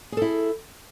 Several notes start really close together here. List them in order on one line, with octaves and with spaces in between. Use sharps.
G#4 A4 E4